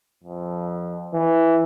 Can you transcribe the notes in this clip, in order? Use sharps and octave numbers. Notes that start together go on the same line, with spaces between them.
F2
E3